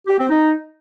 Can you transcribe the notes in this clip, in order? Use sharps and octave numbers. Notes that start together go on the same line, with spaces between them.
G4
C4
D#4